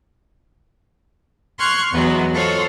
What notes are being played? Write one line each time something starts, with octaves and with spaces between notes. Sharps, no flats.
C6 C#6 F6 F#6 G#6
E2 E3 F#3 G#3 B3
F4 A4 C5 C#5 D#5 F#5